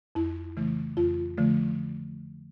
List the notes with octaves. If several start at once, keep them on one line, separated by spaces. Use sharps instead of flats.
F2 E4
C#3 E3 A3
F2 F4
D3 F3 A3